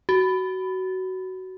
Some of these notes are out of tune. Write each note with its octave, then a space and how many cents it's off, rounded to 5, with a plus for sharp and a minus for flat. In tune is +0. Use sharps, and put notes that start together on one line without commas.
F#4 +20